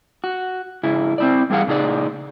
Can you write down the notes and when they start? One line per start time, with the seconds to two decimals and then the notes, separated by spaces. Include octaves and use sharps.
0.24 F#4
0.83 G#2 C#3 E4
1.18 C4 E4 D5
1.50 E2 G3 G#4 F5 F#5
1.67 A#2 C#3 D#4 G#4 D5